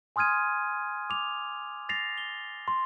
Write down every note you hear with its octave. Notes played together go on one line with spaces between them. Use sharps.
G#5 C6 D#6 F6 G#6 D#7
D6 F7
A6 A#6 C7 F7
G7
C6